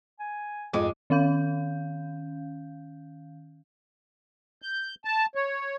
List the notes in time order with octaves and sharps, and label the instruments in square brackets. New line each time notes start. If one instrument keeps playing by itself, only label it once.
[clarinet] G#5
[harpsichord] F2 [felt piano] G#2 D6 D#7 [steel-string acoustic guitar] G#3
[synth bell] D#3 C#4 F5 G6
[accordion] G6
A5
C#5